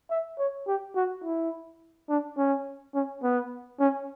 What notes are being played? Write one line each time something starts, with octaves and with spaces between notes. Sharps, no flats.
E5
C#5
G4
F#4
E4
D4
C#4
C#4
B3
C#4